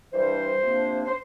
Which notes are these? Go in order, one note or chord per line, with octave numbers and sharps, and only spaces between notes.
G2 E3 G3 D4 C5
C3 F3 A#3 D4
C5